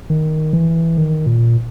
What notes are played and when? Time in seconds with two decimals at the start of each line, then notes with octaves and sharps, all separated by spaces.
0.10 D#3
0.53 E3
0.97 D#3
1.26 A#2